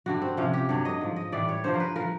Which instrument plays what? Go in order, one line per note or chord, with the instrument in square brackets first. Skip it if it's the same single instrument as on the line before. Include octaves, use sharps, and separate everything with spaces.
[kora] G2 D3 G3 F#4
C4
C3 F3 C#4
G4
G2 D3 F#3 C#5
D#5
G#2 F3
D#5
A2 E3 G3 D5
C#5
G2 D3 F3 C5
A#4
B4
F3 A#4